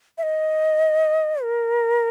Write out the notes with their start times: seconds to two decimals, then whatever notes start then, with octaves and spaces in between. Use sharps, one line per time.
0.18 E5
0.23 D#5
1.43 A#4